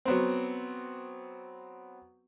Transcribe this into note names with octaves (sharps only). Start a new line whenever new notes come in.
F#3 B3 C4